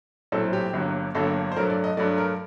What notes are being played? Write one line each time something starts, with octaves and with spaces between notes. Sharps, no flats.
A#1 A2 F#3 C4 A4
G4
G1 G2 F#3 A#3
G1 G2 F#3 A#3 A4
C5
G2 F#3 A3 A#4
D5
D#5
G2 F#3 A3 D5
A#4